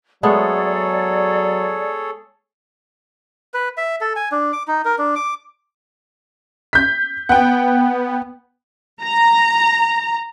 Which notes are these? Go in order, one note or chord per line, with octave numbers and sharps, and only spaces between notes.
F#3 G#3 A3 B3 G#4 A4 C#5 D5
B4
E5
A4
G#5
D4
D6
D#4
A#4
D4
D6
G6 B6
B3 F#5 G5
A#5